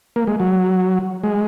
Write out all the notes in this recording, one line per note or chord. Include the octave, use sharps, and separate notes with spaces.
A#3
G#3
F#3
G#3